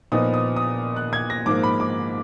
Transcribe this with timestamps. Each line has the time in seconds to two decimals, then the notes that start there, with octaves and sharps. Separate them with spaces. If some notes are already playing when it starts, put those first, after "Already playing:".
0.12 A#2 F3 B3 D#4 D#6
0.34 D#6
0.56 D#6
0.96 F#6
1.13 G#6
1.30 A#6
1.46 G#2 F3 A#3 D6
1.63 B5
1.80 D6